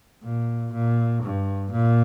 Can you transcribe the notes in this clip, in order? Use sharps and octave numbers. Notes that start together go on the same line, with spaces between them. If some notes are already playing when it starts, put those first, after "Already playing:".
A#2
A#2
G2
A#2